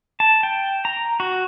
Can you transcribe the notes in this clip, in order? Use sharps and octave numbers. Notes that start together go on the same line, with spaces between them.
A5
G5
A#5
F#4